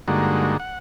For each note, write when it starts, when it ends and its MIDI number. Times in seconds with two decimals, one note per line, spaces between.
0.08 0.57 43
0.08 0.57 50
0.08 0.57 56
0.08 0.57 58
0.08 0.57 63
0.08 0.57 66
0.60 0.79 78